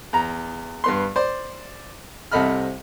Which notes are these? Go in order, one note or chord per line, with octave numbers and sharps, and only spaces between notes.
E2 A#5
G2 B3 C6
C5 D5
C2 C3 A4 D#5 B5 F6